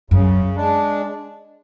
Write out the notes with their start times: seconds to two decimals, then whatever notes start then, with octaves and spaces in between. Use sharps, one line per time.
0.10 F#2 C#3
0.56 G#3 D4